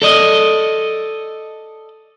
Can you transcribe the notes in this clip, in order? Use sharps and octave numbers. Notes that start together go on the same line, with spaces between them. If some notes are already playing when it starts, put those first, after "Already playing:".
A4 D5 D#5